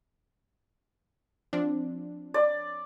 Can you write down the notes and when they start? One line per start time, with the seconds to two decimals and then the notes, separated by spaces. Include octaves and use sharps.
1.53 F3 C4 D4
2.34 D5